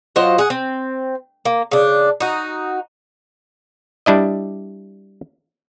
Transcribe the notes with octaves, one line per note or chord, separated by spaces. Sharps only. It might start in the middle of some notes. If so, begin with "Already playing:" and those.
F#3 F4 C5 D#5
G#4 F#5
C4
A#3
C#3 D4
D#4 F#4
G3 D4 E4 D#5